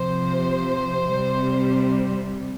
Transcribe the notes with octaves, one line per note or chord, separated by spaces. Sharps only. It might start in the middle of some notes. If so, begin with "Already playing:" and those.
Already playing: C3 F3 C5
C3 G3